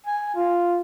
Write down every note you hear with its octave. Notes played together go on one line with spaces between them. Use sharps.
G#5
F4